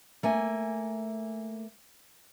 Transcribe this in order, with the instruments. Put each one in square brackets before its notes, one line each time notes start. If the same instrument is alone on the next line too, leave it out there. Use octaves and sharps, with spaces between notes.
[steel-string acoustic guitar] A3 A#3 G#5